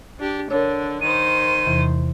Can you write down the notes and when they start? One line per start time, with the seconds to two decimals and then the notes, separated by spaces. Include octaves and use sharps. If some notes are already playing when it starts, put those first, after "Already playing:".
0.19 D4 G4
0.51 D3 D4 A#4 C#5
1.01 D#3 C5 D#7
1.67 E2 C3 E3